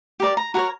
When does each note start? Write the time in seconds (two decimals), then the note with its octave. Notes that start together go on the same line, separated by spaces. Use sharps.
0.20 G4 A#4 D5
0.37 A#5
0.54 F#4 A#4 C#5 A#5